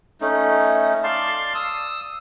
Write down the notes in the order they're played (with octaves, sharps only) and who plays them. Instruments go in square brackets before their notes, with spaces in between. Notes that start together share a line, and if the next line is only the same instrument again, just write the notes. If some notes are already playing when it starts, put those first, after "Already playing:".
[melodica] A3 C#4 D#4
D5 F5 A5 C6
D#6 E6